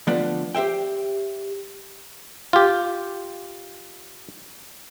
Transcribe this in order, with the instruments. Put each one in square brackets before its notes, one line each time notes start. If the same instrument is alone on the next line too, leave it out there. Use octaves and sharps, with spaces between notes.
[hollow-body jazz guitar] D3 F3 A3 B3 B4 D5
G4 C5 E5 G5
[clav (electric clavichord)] F4 G4